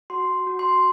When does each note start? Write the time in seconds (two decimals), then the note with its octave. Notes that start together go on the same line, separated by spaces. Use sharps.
0.10 F#4 C6
0.47 F#4
0.59 C6